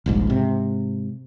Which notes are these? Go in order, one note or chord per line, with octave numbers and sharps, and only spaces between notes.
D#1 A#1 G#2
G#2 C3